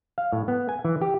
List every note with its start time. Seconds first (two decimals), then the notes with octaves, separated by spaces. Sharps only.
0.18 F5
0.33 A2
0.48 B3
0.69 G#5
0.85 E3
1.01 G4